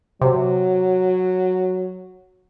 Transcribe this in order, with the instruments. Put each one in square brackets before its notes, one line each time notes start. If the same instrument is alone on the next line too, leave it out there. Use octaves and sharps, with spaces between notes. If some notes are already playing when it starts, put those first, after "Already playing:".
[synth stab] C3 [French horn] F#3